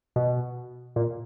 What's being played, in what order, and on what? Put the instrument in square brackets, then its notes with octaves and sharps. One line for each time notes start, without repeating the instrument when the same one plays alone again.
[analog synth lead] B2
A#2